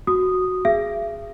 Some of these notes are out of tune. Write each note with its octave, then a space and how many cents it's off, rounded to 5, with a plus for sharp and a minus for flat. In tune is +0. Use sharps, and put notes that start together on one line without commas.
F#4 +0 D#6 -5
G#4 -5 E5 +40